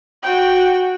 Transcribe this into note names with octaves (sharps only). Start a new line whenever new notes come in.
F#4 G5